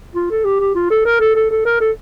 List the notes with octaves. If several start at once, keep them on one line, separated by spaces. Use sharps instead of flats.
F4
A4
G4
G4
F4
A4
A#4
A4
A4
A4
A#4
A4